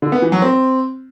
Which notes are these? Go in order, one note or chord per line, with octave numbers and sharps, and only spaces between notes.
D3
B3
E3
F#3
C4